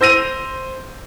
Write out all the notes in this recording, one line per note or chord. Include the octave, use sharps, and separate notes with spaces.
C5 E6 A#6 D#7 F7